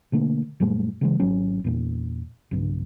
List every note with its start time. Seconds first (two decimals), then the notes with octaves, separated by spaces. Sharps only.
0.12 B2 D3 A3 A#3
0.60 F#2 A#2 G3 A3
1.01 C#3 E3 G#3
1.20 G#1 F#3 C#4
1.64 E2 A#2
2.51 B1 G2 C#3